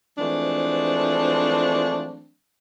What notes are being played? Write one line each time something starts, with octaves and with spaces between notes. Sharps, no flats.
E3 F3 G#3 A3 C4 D4